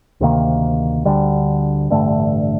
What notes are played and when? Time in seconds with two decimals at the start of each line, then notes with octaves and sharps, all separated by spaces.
0.20 D2 C3 D#3 A#3
1.05 D2 D3 G3
1.90 A1 G2 D3 A3